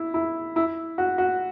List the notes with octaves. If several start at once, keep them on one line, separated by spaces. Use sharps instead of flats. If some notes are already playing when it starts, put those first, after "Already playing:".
Already playing: E4
E4
E4
F#4
F#4